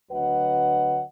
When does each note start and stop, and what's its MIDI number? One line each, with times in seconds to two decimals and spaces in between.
0.11 1.02 38
0.11 1.02 50
0.11 1.02 54
0.11 1.02 71
0.11 1.02 75
0.11 1.02 78